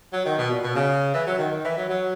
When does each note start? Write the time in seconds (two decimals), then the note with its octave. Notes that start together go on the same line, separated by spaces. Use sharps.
0.13 F#3
0.26 D#3
0.38 B2
0.51 A#2
0.64 B2
0.76 C#3
1.14 E3
1.27 F#3
1.39 D#3
1.51 D#3
1.65 E3
1.77 F#3
1.90 F#3